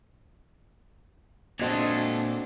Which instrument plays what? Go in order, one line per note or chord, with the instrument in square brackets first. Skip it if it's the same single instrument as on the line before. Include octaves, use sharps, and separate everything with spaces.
[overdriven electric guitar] A#2 A4 [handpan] B3 D#5 [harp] C4 F#4 G#6 [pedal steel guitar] D4